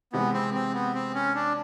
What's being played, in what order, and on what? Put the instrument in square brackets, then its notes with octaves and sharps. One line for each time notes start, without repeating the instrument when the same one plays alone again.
[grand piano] C3 E3 G#3 [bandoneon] B3
[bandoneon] C4
C4
B3
C4
C#4
D4